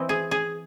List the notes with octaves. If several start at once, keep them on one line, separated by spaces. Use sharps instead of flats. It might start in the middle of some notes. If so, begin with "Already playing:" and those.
Already playing: E3 C4 E4 D#5
G#4
G#4